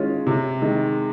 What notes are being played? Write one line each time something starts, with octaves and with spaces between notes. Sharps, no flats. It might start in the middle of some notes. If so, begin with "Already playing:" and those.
Already playing: D#3 G#3 C#4 F4
C3
D#3 G#3